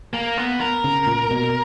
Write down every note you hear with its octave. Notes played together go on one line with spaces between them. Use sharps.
A#3
B3
A#4
C#3
A#2
B2